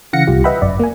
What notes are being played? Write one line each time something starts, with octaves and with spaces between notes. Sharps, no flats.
C#3 E3 F5 F#5 A#6 C#7
C2 F4 G4
B4 D#5 E5 F#5 G5 B5
G1 F#2 D5
A#3 G#5